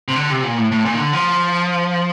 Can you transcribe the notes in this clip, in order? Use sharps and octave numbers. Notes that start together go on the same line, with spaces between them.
C3
D3
C3
A#2
A2
A2
A#2
D#3
D3
F3